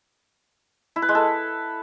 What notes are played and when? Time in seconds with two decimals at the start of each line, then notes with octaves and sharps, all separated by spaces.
0.96 E4
1.02 B4
1.09 G#3
1.15 A4